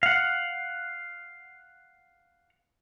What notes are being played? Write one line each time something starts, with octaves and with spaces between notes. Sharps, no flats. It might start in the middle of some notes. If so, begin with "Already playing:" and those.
F5 F#5